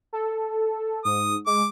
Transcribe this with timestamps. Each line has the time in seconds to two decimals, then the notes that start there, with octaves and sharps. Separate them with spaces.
0.13 A4
1.05 G#2 D#6
1.47 G#3 D6